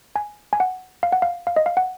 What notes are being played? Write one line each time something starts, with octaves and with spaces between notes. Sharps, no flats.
G#5
G#5
F#5
F5
F#5
F5
F5
D#5
F5
F#5